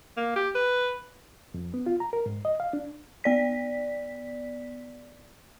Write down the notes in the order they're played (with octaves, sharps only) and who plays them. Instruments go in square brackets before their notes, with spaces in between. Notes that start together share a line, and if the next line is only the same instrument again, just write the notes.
[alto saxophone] A#3
G4
B4
[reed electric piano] F2
B3
F4
A#5
A#4
G#2
D#5
F5
D4
[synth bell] B3 D5 B6